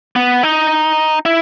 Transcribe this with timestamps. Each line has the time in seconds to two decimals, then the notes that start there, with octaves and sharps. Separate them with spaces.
0.16 B3
0.43 D#4
1.26 E4